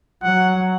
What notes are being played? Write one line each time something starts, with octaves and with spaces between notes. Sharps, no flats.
F#3 F#5